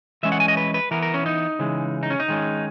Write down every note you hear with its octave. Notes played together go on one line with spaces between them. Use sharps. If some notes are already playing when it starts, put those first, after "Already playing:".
E3 G#3 C#4 E5
F#5
G#5
D#5
B4
B4
E3 B3 A#4
A#4
C#4
D#4
C#3 E3 G#3
D#4
C#4
D#4
D#3 G#3 C#4